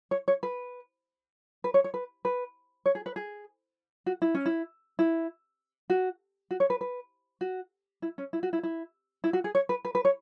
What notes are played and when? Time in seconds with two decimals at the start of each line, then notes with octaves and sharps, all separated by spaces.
0.11 C#5
0.28 C#5
0.43 B4
1.64 B4
1.74 C#5
1.84 C#5
1.94 B4
2.25 B4
2.86 C#5
2.95 G#4
3.06 B4
3.16 G#4
4.06 F#4
4.22 E4
4.35 C#4
4.46 E4
4.99 E4
5.90 F#4
6.51 F#4
6.60 C#5
6.70 B4
6.81 B4
7.41 F#4
8.02 E4
8.18 C#4
8.33 E4
8.43 F#4
8.53 E4
8.63 E4
9.24 E4
9.33 F#4
9.44 G#4
9.55 C#5
9.69 B4
9.85 B4
9.95 B4
10.05 C#5